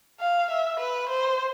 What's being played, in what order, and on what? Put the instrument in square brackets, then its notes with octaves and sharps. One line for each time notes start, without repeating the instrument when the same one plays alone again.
[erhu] F5
E5
B4
C5